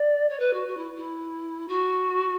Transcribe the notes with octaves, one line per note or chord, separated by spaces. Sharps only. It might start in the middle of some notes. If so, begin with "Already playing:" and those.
Already playing: D5
C#5
B4
F#4
F#4
E4
E4
F#4